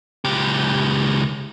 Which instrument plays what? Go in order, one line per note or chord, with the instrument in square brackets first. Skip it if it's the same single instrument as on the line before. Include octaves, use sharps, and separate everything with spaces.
[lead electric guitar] C#2 G4